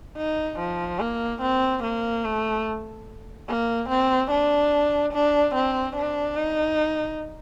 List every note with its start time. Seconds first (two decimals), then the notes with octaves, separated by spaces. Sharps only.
0.17 D#4
0.59 F3
1.00 A#3
1.42 C4
1.84 A#3
2.24 A3
3.48 A#3
3.89 C4
4.31 D4
5.13 D4
5.55 C4
5.96 D4
6.37 D#4